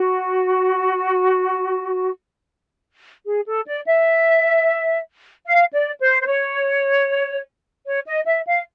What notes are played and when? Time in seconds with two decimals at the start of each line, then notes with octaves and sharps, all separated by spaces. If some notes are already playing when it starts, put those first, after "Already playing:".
Already playing: F#4
3.26 G#4
3.47 A4
3.67 D5
3.86 E5
5.46 F5
5.73 D5
6.00 C5
6.22 C5
6.26 C#5
7.86 C#5
8.06 D#5
8.27 E5
8.47 F5